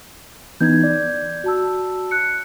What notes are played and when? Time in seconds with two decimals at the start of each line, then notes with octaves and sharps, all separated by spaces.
0.61 E3 B3 D#4 G6 G#6
0.84 D5
1.44 F#4 A5 E6
2.11 F#6 C#7